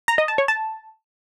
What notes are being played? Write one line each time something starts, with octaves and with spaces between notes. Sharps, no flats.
A#5
D#5
A5
C#5
A5